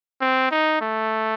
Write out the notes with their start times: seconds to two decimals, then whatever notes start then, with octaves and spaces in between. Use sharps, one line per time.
0.22 C4
0.52 D#4
0.81 A3